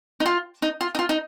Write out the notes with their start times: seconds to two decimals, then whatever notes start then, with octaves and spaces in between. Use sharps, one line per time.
0.20 D#4
0.26 F4
0.62 D#4
0.81 F4
0.95 D#4
0.99 F4
1.09 D#4